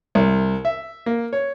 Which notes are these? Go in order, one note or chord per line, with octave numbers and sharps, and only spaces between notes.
C2
E5
A#3
C#5